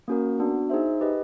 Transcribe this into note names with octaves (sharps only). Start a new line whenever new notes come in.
A#3 C#4 F#4 A#4
B3 D4 F#4
D#4 G#4 C5 E5
G4 B4 D#5